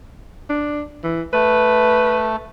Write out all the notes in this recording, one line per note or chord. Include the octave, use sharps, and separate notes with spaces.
D4
E3
A3 B4